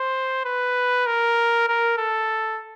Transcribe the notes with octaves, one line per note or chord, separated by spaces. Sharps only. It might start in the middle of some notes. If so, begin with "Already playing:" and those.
Already playing: C5
B4
A#4
A#4
A4